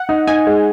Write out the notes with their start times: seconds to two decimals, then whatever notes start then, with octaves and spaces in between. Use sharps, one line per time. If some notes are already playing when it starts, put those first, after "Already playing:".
Already playing: F#5
0.09 D#4
0.27 D#4 G#5
0.47 G#3